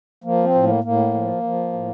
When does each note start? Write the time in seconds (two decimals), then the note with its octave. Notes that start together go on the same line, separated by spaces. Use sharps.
0.24 F3 A#3
0.44 C4
0.55 A2
0.64 A#3
0.84 A2 A#3
1.14 F3
1.43 F3
1.73 A2